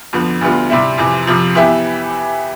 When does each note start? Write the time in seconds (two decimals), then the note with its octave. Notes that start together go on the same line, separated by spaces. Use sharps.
0.13 F2 D3 F3 B3
0.41 D2 D3 G3 B3 F4
0.70 C3 G3 C4 E4
0.98 F2 C3 E3
1.27 F2 C3 F3
1.55 E3 B3 E4 G4